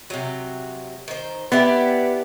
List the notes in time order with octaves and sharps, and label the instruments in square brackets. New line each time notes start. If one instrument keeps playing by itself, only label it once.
[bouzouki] C3 F#3
D#3 C5
[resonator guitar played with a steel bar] B3 [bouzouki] D4 E4 G4